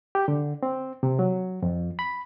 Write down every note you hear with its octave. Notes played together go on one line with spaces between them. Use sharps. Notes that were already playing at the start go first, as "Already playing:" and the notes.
G4
D3
C4
C3
F#3
F2
B5